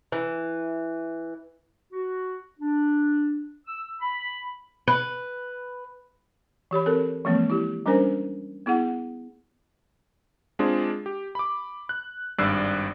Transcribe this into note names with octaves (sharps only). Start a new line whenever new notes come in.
E3
F#4
D4
E6
B5
B4
E3 G4 C#5 B5
C4 A4 A#4
E3 F3 G#3 A#3 C4
E4 G4
G3 C#4 D4 A#4 C5 G#5
B3 E4 G#4 F#5
G#3 C4 D4 F4 G#4
G4
B5 D6
F#6
G#1 G2 D5 E6 F#6 C7